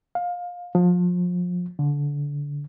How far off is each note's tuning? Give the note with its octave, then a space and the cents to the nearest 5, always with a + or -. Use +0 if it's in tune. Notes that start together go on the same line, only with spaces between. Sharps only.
F5 +20
F3 +30
D3 -20